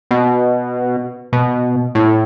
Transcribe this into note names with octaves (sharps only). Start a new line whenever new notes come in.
B2
B2
A2